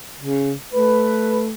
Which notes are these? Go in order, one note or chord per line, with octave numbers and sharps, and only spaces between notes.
C#3
A3 B4